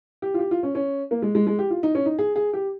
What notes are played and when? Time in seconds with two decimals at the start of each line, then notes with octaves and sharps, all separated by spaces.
0.22 G4
0.34 F4
0.39 G4
0.51 F4
0.63 C#4
0.75 C#4
1.11 A#3
1.22 G#3
1.35 G#3
1.47 G#3
1.59 G4
1.70 F4
1.83 D#4
1.95 C#4
2.06 D#4
2.19 G#4
2.36 G#4
2.53 G4